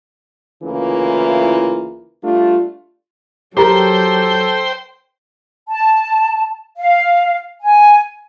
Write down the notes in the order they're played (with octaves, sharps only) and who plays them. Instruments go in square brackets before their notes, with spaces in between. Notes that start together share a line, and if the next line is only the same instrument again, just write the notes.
[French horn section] D2 C#3 E3 A#3 E4 F4
G3 A3 D4 F4
[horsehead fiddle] F#3 [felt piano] G4 A#4 A#5 [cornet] A4 [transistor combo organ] C5 G5
[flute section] A5
F5
G#5